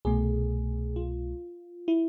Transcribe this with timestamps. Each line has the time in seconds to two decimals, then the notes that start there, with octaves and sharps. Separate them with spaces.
0.05 C2 B2 A3 G#4
0.96 F4
1.88 E4